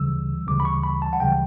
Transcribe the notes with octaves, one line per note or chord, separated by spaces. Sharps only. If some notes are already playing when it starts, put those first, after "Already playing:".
Already playing: D2 C#3 E3 G3 E6
D2 C#3 E3 G3 D6
B5
C#6
B5
A5
F#5
D2 C#3 E3 G3 G5